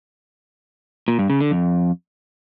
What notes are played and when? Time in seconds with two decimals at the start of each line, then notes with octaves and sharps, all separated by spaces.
1.08 A#2
1.19 G2
1.30 C#3
1.40 D3
1.51 F2